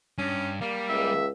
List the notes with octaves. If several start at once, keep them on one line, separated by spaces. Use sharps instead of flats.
G2 C#4
G3 A#3
C#2 E5